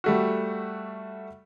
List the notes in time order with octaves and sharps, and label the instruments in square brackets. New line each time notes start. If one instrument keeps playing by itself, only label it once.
[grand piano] G3 A3 F#4